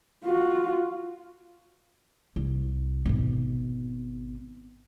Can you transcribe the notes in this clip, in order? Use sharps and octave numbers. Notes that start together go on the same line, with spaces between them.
F4 F#4
C2
G#1 B2